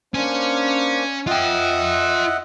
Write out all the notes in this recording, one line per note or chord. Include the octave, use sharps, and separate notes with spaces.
A#3 C#4 D4 C5
F4 D#5 E5 F#5 G5